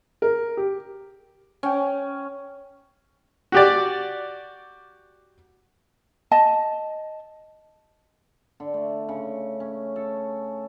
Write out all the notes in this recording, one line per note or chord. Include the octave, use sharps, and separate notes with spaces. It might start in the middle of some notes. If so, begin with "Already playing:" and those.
A#4
G4
C#4 C#5 G5
F#4 G4 D5
D#5 A5
D3
A3
C#3
C#4
A4